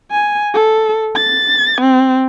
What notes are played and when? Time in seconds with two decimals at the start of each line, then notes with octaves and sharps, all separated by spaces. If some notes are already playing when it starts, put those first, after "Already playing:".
0.12 G#5
0.54 A4
1.15 A6
1.81 C4